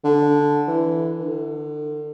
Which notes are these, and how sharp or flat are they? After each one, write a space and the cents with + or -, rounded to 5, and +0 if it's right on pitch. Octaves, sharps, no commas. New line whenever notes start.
D3 -5
E3 +0
D3 +35